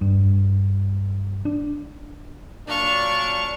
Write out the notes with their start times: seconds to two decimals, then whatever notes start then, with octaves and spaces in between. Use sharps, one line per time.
0.01 G2
1.45 D4
2.67 A#2 F#3 D4 F5 C#6